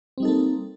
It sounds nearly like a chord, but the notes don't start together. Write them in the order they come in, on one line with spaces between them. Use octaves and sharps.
C4 G3 D#4 A4 A#3